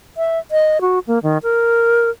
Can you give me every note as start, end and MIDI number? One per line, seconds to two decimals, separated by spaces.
0.17 0.39 76
0.51 0.81 75
0.81 0.99 66
1.07 1.19 58
1.23 1.38 51
1.43 2.10 70